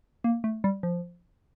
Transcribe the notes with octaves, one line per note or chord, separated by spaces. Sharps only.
A#3
A3
G3
F3